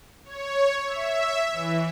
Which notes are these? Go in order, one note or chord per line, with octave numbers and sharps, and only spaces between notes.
C#5
E5
E3